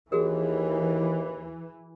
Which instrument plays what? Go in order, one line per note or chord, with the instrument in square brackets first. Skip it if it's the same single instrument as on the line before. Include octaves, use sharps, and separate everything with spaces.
[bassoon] D#2 [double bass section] E3 [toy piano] F#4 G#4 A#4